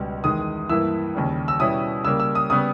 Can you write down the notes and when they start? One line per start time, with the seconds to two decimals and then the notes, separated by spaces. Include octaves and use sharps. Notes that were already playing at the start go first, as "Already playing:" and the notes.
Already playing: C#2 B2 G3
0.24 E2 D#3 G#3 D#6
0.69 G2 E3 A#3 E4 E6
1.14 D#2 C#3 G3
1.48 E6
1.60 B2 G3 C#4 E4 D#6
2.05 C#3 G3 A#3 E6
2.20 E6
2.35 D#6
2.50 C#3 G3 B3 D#6